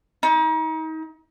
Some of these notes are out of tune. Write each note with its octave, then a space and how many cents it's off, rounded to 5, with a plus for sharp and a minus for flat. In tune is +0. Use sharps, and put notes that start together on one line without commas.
D#4 +35